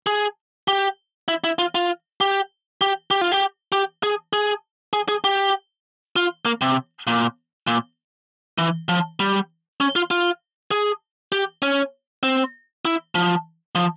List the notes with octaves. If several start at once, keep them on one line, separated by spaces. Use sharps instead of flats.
G#4
G4
E4
E4
F4
F4
G4
G4
G4
F4
G4
G4
G#4
G#4
G#4
G#4
G4
F4
A#3
C3
A#2
A#2
E3
F3
G3
C#4
F4
F4
G#4
G4
C#4
C4
E4
F3
F3